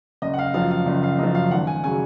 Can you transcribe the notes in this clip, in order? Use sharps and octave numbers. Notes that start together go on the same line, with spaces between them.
F#1 D#5
F#5
F5
F#2 F3 F5
F5
F#1
F5
F#2 F3 D#5
F5
G#1 F#5
G#5
C#3 F#3 G#5